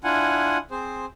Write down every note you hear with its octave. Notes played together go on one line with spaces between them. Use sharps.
D4 E4 F4 F#5 G#5
C4 G#4 C5